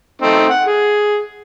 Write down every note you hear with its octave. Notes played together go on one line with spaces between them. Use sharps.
A3 C4 D#4
F#5
G#4